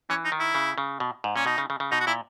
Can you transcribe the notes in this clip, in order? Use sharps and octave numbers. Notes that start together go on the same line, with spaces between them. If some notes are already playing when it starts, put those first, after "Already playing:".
E3 C#4
D#4
D#3
E4
C#3
C#3
B2
G#2
A#2 C#4
B2 D#4
C#3
C#3
C#3
B2 D#4
F#4
A#2 E4